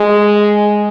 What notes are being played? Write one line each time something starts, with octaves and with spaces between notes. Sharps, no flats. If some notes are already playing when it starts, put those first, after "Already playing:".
Already playing: G#3